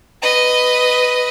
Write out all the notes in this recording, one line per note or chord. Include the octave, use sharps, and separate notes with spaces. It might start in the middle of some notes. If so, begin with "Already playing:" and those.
B4 D#5